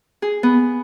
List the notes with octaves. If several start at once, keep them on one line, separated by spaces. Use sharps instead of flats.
G#4
B3